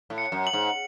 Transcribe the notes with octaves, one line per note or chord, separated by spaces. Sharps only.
A2
C#7
F#2
F#7
G#2